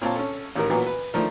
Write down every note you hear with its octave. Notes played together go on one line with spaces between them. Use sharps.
A#2 C4 C#5 F5 A5
C#4 A4
A1 A2 D#3 A#4
A#2 E3 F#3 A#3 B3
B4
D#3 F3 A3 D4